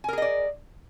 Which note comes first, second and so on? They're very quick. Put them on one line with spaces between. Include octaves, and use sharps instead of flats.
G#5 A#4 G#4 D#5 D5